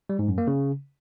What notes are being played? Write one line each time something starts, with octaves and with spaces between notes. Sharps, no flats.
G3
G#2
F#2
A#3
C#3